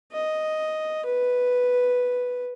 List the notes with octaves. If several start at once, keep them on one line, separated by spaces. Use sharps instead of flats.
D#5
B4